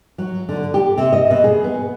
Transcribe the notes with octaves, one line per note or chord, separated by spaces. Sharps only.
F#3
D3
G4
C3
D#5
B2
G#4
B3